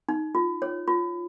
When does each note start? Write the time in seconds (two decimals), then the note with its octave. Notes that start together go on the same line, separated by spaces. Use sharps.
0.09 D#4
0.35 F4
0.62 C#5
0.88 F4